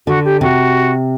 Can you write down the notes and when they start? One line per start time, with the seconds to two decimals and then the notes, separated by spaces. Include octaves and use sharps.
0.07 D3 F#4
0.24 G4
0.41 C3 F#4